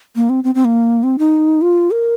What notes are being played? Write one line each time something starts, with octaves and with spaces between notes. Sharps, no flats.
A#3
C4
C4
C4
A#3
C4
D#4
F4
A#4